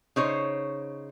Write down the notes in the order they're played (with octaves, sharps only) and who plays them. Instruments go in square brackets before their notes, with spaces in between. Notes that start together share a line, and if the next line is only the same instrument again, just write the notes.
[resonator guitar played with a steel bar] C#3 D#4 C5 C#5